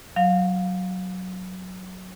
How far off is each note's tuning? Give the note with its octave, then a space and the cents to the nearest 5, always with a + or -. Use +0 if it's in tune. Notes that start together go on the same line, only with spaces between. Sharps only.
F#3 +0 F5 +10